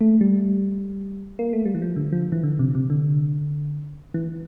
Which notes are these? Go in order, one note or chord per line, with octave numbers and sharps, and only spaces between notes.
A3
G3
A#3
A3
G3
E3
F3
D3
F3
E3
D3
C3
C3
D3
E3